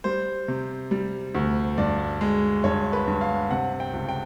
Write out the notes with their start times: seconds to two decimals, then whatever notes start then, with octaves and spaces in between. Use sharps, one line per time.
0.04 G3 C5
0.48 C3
0.91 G3
1.35 D2
1.78 G2 D5
2.21 G#3
2.64 G2 C#5
2.93 B4
3.07 G2
3.21 F5
3.51 C3 F#5
3.80 G5
3.93 C#2
4.09 G5